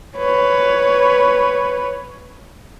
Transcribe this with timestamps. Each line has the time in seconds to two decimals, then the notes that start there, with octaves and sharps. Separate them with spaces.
0.17 B4 C#5